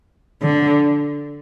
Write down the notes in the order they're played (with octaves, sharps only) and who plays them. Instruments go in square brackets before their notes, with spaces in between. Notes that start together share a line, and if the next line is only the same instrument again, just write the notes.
[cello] D3